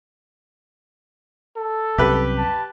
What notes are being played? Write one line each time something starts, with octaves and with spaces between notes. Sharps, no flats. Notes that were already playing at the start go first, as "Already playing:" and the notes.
A4
C2 F#2 C3 G4 B4
A5